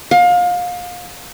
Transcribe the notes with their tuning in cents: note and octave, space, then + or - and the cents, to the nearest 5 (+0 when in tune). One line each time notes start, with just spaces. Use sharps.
F5 +30